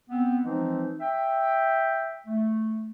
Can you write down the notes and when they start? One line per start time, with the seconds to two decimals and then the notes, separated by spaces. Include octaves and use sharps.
0.10 B3 C4
0.44 E3 F3 G#3 C4 D#4
1.00 E5 G5
2.27 A3